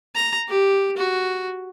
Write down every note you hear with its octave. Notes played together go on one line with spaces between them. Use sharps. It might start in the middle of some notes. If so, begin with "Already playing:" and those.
A#5
G4
F#4